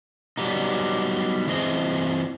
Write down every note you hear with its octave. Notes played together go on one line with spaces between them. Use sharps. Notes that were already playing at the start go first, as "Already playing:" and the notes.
F#3 G3 B3 D#4
E3 C4 G#4 D#5